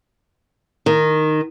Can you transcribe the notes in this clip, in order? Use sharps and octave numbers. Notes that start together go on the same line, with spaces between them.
D#3